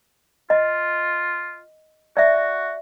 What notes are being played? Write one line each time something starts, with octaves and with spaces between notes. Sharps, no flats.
F4 D#5
F#4 D5 E5